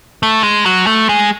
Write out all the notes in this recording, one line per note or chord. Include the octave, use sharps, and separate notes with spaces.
A3
G#3
F#3
A3
G#3